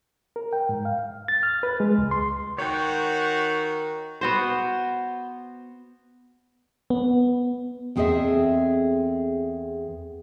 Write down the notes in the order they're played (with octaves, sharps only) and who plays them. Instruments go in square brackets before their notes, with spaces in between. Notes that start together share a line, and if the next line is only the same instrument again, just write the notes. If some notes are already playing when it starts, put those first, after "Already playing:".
[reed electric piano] A#4
G5
G#2
F5
A6
F6
B4
G#3
C#2
C6
[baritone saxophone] D#3 [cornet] F#4 [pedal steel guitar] C#5 G5
[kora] B3 F#4 C5
[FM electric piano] B3
[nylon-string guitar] E2 C4 G#4 A4 D#5 E5